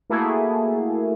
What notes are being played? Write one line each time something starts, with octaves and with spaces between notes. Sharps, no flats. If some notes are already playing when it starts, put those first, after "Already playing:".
A3 A#3 E4 F#4 G#4 A4